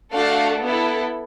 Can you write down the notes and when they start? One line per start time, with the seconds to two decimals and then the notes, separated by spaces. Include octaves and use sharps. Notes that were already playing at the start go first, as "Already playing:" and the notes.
0.13 A3 D4 F#4 A4 F5
0.61 B3 E4 A4